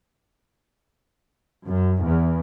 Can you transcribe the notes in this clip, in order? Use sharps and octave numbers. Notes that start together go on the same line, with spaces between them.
F#2
E2